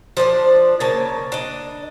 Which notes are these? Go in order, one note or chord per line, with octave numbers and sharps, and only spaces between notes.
F3 D4 C5 D5
C#3 A#3 A5
D4 D#5